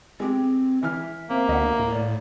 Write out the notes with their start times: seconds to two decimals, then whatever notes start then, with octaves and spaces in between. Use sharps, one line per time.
0.20 G#3 C4 G4
0.83 E3 E5 F6
1.30 A#3 C4
1.49 D2 D#5 F#5
1.79 A2
1.92 D5